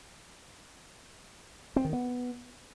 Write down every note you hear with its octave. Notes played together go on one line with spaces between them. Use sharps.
C4
D#3
B3